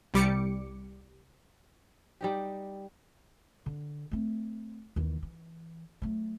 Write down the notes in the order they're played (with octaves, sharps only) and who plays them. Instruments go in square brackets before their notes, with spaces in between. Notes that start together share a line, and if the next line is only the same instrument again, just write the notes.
[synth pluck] C2 G3 D6 C#7
[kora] G3 D#4 G4
[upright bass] D3
A3 C4
D#2 E3
E3
F#3 A3